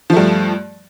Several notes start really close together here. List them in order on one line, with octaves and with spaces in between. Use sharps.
F3 A3 G2